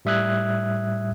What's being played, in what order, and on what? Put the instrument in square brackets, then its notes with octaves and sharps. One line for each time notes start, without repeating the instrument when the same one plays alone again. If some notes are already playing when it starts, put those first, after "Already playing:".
[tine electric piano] A2 G3 E5 D#6 F#6 G#6